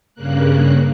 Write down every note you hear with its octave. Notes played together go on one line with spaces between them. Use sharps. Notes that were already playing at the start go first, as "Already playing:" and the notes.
G2 C#3 A#3 F#6